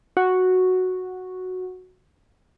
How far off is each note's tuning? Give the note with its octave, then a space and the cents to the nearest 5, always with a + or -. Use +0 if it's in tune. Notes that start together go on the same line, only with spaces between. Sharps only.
F#4 -5